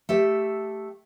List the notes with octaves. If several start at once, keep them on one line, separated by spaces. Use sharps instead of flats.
A3 G4 E5